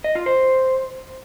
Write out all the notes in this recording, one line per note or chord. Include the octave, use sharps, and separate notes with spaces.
D#5
F4
C5